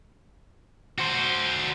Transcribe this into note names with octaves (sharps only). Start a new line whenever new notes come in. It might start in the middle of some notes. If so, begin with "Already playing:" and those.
F#4 C5